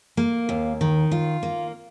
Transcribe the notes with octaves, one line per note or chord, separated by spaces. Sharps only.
A#3
D#2
D#3
F4
A#3